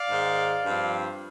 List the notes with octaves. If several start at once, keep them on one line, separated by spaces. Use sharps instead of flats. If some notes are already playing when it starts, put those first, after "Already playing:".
Already playing: D5 F5
G#2 D#3 G#3
G2 F3 C4